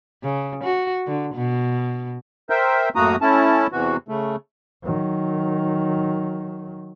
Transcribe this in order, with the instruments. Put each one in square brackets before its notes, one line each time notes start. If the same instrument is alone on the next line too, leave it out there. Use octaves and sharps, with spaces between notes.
[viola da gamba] C#3
F#4
D3
B2
[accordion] A#4 C5 E5 G5
F#2 A2 A#3 F#4 A#5 D#6
A3 C#4 E4 A5
E2 C3 E3 F#4
C#3 A3
[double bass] D#3 F#3